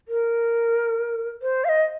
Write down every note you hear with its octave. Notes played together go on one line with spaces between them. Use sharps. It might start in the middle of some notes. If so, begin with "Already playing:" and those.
A#4
C5
F5
D#5